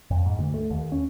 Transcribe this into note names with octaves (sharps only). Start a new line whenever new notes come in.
F2
G#2
D2
A3
D#2
C#4